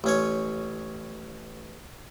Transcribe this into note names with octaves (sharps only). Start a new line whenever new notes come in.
A1 C#4 C#5